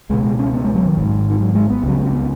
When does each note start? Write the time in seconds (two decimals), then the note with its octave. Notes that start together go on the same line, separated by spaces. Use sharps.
0.09 C#2 B2 G#3
0.24 G#3
0.39 C#4
0.54 B3
0.64 G#3
0.75 F#3
0.86 D#3
0.97 G#1 G#2
1.30 D#3
1.40 F#3
1.55 G#3
1.70 B3
1.83 C#2 C#3 F#3
1.98 G#3
2.06 C#4
2.13 B3